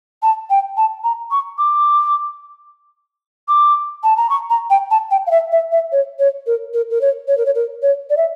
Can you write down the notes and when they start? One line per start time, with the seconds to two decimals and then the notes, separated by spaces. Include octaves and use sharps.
0.23 A5
0.50 G5
0.77 A5
1.04 A#5
1.31 C#6
1.58 D6
3.48 D6
4.04 A5
4.17 A#5
4.30 C#6
4.50 A#5
4.70 G5
4.91 A5
5.11 G5
5.27 F5
5.31 E5
5.52 E5
5.72 E5
5.92 C#5
6.19 C#5
6.47 A#4
6.74 A#4
6.91 A#4
7.01 C#5
7.28 C#5
7.37 A#4
7.46 C#5
7.55 A#4
7.82 C#5
8.10 D5
8.17 E5